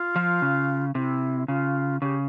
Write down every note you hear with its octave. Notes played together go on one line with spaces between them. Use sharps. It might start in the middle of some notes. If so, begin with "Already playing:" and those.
Already playing: F4
F3
C#3
C3 E4
C#3 F4
C#3 G4